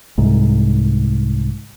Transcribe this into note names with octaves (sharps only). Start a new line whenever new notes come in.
C2 G#2